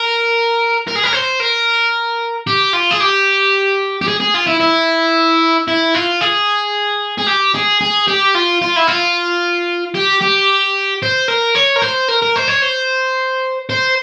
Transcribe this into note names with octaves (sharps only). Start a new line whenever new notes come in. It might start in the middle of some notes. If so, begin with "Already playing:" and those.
Already playing: A#4
A#4
G#4
A#4
C5
A#4
G4
F4
G#4
G4
G4
G#4
G#4
F4
E4
E4
E4
F4
G#4
G#4
G4
G#4
G#4
G4
F4
F4
E4
F4
G4
G4
C5
A#4
C#5
A#4
C5
A#4
A#4
C5
C#5
C5
C5